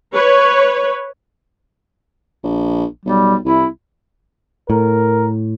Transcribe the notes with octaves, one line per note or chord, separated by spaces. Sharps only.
B4 C#5
A#1
B1 G3
C2 E4
A2 A#4